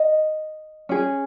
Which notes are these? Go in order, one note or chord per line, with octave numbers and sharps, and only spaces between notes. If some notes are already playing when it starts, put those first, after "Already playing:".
Already playing: D#5
C#4 G#4